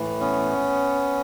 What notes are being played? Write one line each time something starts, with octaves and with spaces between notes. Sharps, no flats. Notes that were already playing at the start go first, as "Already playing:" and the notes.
Already playing: A2 E3
B3 C#4